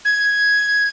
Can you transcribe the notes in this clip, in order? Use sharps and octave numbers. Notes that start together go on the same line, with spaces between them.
G#6